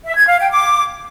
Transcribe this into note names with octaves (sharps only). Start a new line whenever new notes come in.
E5
G#6
F5
G5
D6